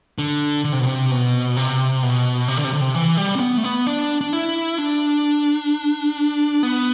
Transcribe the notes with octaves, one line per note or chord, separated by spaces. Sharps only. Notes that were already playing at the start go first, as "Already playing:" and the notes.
D3
D3
C3
B2
C3
B2
C3
B2
C3
D3
C3
D3
C3
E3
G3
C4
B3
A3
B3
D4
D4
E4
D4
B3